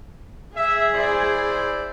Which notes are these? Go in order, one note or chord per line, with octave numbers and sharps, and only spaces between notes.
G#4 E5
E4 C5 D5